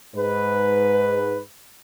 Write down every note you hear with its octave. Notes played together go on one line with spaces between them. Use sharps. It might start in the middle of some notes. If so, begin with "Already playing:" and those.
G#2 B4